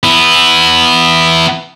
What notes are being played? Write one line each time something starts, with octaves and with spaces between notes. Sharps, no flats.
B3 E4